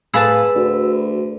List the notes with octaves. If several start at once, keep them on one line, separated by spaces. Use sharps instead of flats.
A2 G#4 B4 F5 A5 B5 E6 A6
D2 D4 F#4